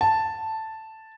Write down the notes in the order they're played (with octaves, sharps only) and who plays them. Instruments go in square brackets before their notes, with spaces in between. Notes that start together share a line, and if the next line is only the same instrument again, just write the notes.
[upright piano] A5